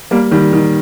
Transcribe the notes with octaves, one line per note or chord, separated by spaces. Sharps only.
G3 A#3
D#3 G3
D#3